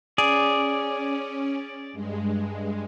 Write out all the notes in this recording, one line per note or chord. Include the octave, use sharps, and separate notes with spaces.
C#4 G#4 D5
G2 G#3